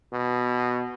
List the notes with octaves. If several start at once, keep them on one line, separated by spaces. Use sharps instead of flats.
B2